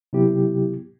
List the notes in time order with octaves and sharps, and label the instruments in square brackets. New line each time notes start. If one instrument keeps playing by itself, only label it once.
[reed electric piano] C3 F#3 B3 E4 G4